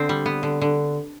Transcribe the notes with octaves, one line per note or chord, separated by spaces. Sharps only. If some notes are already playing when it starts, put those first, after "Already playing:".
Already playing: D3 B3 C4
G3
B3
D3
D3